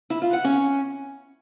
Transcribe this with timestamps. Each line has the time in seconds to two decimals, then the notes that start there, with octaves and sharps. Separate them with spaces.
0.10 E4
0.22 F4
0.33 F#5
0.44 C#4